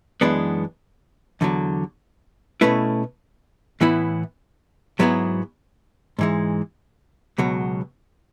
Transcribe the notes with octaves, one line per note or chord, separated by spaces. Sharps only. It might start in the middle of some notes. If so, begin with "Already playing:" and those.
F#2 E3 G#3 B3 D4
E2 D3 F#3
B2 A3 C#4 E4 B4
A2 E3 B3 E4
G#2 F#3 B3 E4 G#4
G#2 E3 G#3
C#2 B2 F#3